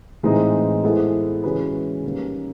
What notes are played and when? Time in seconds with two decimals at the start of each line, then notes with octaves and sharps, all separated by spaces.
0.23 A2 E3 G#3 C4 D#4
0.83 G#3 B3 E4 A4 C5
1.43 E3 G#3 C#4 F#4 B4
2.04 D#3 G3 A#3 C#4